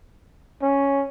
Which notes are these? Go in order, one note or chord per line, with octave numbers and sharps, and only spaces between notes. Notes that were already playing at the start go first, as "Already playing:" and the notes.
C#4